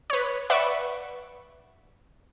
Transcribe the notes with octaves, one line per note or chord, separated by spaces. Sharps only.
B4 C#5
B4 D5 E5 F#5 B5 C#6